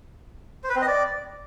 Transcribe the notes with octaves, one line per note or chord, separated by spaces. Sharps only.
C5
B4
C4
D#5
D5